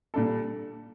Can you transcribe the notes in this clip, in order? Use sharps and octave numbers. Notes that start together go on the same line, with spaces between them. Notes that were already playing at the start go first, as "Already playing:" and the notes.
A#2 G3 D4 A4